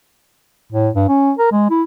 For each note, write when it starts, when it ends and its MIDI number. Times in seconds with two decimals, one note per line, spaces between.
0.72 0.90 45
0.95 1.07 43
1.09 1.32 61
1.39 1.50 70
1.52 1.66 56
1.70 1.83 64